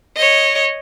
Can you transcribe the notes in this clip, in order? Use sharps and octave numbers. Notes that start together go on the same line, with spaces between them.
C#5 D#5